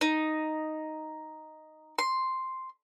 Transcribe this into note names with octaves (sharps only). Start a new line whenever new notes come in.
D#4
C6